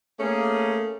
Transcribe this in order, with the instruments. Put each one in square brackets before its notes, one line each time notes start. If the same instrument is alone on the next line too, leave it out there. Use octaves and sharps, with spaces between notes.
[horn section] A3 A#3 C#4 G#4